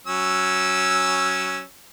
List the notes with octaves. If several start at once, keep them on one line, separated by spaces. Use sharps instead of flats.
F#3 C#4 E6